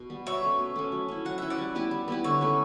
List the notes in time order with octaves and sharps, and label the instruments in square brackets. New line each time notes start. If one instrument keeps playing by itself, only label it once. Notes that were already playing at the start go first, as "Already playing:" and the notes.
Already playing: [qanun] B2
G3 B3
[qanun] B2 [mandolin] C#5 E5
[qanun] A3 C#4
B2
A3 C#4
F#3
C#4 E4
[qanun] F#3 [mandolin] F#5
[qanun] C#4 E4 [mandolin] E5
[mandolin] D5 F#5
[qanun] G3
B3 E4 G4
G3
B3 E4 G4
[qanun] D3 [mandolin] C#5 E5
[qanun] A3 C#4